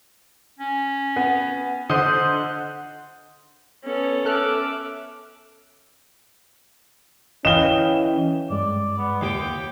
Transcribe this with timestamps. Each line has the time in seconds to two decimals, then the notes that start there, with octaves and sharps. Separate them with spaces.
0.59 C#4
1.16 B3
1.89 D3 C5 D#5 F#5
3.85 B3 C#4 A4
4.25 A4 E5 D6 F6 F#6
7.45 E3 C#4 D#5 F5 G5 E7 G7
8.50 G2 G#3 D5
8.98 B3
9.21 D#2 G4 G5 D6